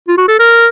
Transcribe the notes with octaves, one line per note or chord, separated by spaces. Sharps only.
F4
F#4
A4
A#4